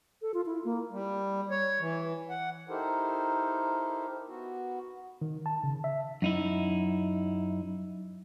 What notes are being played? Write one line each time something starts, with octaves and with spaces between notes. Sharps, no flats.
A4
F4
E4
A#3
G3
C#5
E3
F#5
D#4 E4 G4 A4 A#4 C5
B3 F#4
D#3
A5
C#3
E5
F#2 D#4 E4